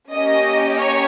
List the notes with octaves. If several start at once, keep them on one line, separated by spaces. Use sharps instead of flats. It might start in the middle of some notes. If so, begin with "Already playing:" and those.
A#3 C#4 G4 D#5
C#5